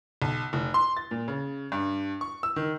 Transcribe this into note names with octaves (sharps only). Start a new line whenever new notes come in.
B1
F1
C6
A6
A#2
C#3
G2
C#6
E6
D#3